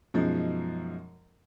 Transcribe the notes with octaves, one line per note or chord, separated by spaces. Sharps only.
F#2 B2 F3 G#3 D#4